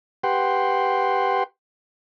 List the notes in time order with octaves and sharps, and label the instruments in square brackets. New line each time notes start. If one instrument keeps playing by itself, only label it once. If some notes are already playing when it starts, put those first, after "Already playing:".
[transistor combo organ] G4 B4 F#5 G5 C6